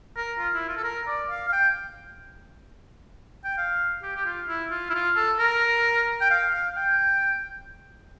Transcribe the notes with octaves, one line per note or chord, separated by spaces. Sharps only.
A#4
F4
E4
F4
A4
A#4
D5
F5
F5
G5
G5
F5
G4
G4
F4
E4
F4
E4
F4
A4
A#4
G5
F5
F5
G5